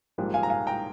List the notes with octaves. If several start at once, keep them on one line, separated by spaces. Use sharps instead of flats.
A#1 G#2 G3 A#3
F5 G#5
A#5
F5 G#5
G5 A#5